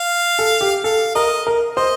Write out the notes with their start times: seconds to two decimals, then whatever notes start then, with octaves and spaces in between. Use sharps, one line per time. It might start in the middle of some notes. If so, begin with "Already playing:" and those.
Already playing: F5
0.39 A4
0.61 G4
0.84 A4 F5
1.15 A#4 D#5
1.47 A#4
1.77 C5 D#5